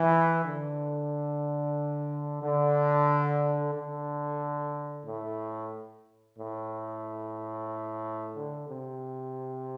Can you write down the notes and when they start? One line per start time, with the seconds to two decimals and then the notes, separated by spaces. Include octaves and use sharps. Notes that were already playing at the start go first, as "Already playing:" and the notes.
Already playing: E3
0.43 D3
2.41 D3
3.73 D3
5.05 A2
6.36 A2
8.34 D3
8.67 C3